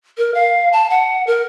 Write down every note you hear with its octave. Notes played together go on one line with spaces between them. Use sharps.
A#4
F5
A5
F#5
A#4